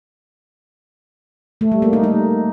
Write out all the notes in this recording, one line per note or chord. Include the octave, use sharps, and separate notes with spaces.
A3
G3
A#3
D#4
D#4